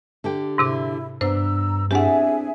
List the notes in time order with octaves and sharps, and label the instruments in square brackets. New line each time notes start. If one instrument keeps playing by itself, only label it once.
[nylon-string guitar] D3 G4 G5
[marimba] G#2 C3 D6 [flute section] E4
[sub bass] G2 [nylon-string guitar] B3 D4 [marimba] C5 [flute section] A#5 E6
[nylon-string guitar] C4 D4 E4 [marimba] G4 F#5 [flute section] G#4 E5 G#5